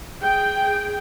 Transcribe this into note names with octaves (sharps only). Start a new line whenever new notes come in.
G#4 G5